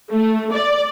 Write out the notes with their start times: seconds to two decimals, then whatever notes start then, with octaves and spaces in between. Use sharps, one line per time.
0.11 A3
0.52 D5